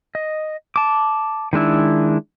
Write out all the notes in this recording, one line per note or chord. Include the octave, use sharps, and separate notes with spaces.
D#5
A5 D6
D#3 G#3 D4 E4